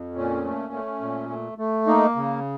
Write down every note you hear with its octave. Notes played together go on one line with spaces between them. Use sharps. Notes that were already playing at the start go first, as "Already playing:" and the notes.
Already playing: F2
A#2 C#4
A3
A3
A#2
A3
A3
A#3 D#4
C#3